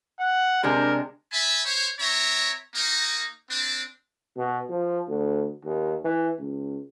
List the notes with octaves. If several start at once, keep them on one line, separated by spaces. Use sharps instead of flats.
F#5
C3 G#3 D4 A#4
E5 G#5 A5 B5
C5 C#5
C4 C#5 E5 A#5
A#3 D#4
C4 D4
B2
F3
D2
D#2
E3
C#2